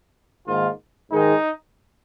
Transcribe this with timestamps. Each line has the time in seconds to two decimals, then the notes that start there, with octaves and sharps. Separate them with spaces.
0.47 G#2 D#3 A#3 F4
1.12 G#2 D#3 G#3 D#4